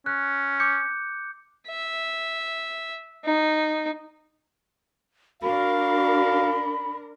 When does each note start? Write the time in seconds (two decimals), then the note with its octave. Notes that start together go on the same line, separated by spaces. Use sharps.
0.06 C#4 F#6
0.60 D6 G6 C#7
1.68 E5
3.25 D#4
5.42 D4 F#4 A#4 F5 B5